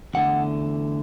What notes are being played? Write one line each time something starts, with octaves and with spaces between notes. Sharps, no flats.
E2 D3 A3 F#5